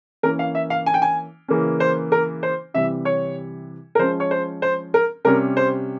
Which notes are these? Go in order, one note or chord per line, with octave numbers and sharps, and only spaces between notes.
E3 A#3 C#4 A#4
F5
E5
F5
G#5
G5
G#5
C#3 E3 A#3 C#4
C5
A#4
C5
C3 E3 G3 E5
C#5
A#4
F3 G#3 C#4 C5
C#5
C5
C5
A#4
C3 G3 C#4 A#4
C5